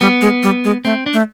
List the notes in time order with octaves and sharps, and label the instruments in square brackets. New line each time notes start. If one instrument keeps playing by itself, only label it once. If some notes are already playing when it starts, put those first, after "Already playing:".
[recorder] G3 [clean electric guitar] B3
[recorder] G#3
G3
G#3
[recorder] A3 [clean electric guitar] C4
[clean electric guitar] D4
[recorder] A3